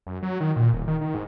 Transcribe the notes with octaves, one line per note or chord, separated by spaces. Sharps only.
F#2
F#3
D#3
A#2
D#1
D#3
D#3
G#2